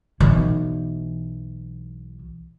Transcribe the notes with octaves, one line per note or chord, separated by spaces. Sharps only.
B1 E3